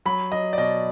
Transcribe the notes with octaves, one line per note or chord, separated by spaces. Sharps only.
F#3 B5
F#3 D#5
D5
B2 D#5